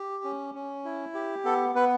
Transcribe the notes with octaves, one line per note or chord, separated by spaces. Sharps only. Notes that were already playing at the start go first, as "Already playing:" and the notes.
Already playing: G4
C#4
C#4
E4
G4
B3 A4
B3 B4